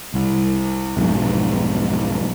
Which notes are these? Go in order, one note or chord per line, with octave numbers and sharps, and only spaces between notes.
C2
B1 F2 G#2